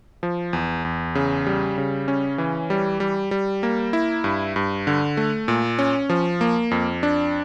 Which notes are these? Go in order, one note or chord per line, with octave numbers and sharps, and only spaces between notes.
F3
E2
E2
C#3
G3
C#3
C#4
E3
G3
G3
G3
A#3
E4
G2
G2
D3
A3
A#2
C#4
F3
A#3
F2
D4